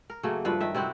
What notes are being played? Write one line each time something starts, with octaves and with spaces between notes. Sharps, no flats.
A#4
C#3 F#3 A3 A#3
G2 F3 B4
D#3 E5
C3 C4 E4 F#4